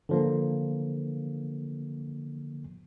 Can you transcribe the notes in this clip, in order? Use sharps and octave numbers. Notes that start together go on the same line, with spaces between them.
D3 F3 A#3